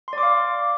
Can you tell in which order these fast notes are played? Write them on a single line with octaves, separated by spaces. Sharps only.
C6 D5 D6 F5